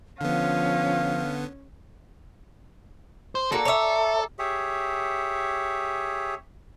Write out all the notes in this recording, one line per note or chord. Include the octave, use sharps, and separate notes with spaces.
D3 F3 B3 C#4 F5
C5
A#3 F#4 A4
C#5 E5 A#5 D6 E6
G4 G#4 C#5 E5